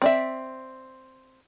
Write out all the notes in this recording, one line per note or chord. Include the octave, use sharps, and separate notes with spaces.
C4 D5 E5